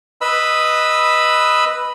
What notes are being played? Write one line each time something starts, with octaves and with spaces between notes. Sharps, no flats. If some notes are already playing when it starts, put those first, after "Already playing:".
B4 D#5 B5 E6